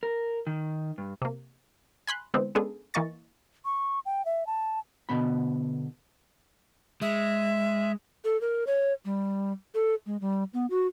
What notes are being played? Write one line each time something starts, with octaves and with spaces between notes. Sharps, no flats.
A#4
D#3
G2
C3 A#3
G#5 B5 C6 F#6
D3 E3 G#3 B3 C4
G#3 B3 C#4 D4 G#4 A4
E3 A#3 D#5 C#6 A6
C#6
G5
E5
A5
B2 D3 B3 B5
G#3 E5
A4
A#4
C#5
G3
A4
G#3
G3
B3
F#4